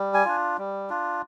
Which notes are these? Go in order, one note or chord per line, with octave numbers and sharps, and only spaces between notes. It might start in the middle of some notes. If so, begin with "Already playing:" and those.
Already playing: G3
G#5
D4 F4
G3
D4 F4